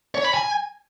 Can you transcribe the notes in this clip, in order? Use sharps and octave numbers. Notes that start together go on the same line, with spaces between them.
C#5
B5
G#5